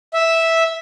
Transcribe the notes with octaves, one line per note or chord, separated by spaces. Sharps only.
E5